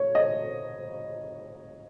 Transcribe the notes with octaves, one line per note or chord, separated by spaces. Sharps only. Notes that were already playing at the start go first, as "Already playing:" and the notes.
Already playing: C#5
D#5